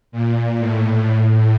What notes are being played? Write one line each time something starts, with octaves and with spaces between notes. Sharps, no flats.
A#2
A2